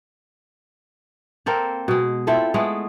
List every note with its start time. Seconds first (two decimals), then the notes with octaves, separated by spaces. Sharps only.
1.46 A#3 C4 A4 A#4
1.88 B2 G#3
2.27 C4 E4 F4 A4
2.54 G#3 A3 B3 E4